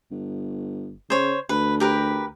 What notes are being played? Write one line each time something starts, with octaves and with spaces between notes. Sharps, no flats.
G1
C#3 C5 C#5
D2 B4
G4 A#4 B4